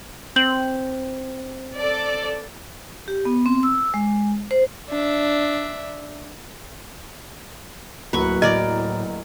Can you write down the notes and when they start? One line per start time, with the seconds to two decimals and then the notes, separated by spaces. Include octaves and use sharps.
0.36 C4 G6 F#7
1.77 A4 D5
3.08 G4
3.25 B3
3.46 C4
3.63 E6
3.94 G#3
4.51 C5
4.90 D4 E5
8.13 D1 D2 F#3 A#3 B4 C#6
8.42 A2 A#4 D5 D#5 G5